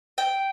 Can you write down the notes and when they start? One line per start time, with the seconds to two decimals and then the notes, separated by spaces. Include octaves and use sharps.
0.18 G5